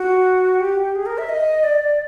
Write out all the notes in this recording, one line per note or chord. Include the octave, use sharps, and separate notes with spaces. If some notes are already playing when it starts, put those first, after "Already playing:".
Already playing: F#4
G4
G#4
A#4
E5
D#5
D5